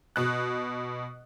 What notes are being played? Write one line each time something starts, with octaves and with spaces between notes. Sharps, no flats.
B2 F#6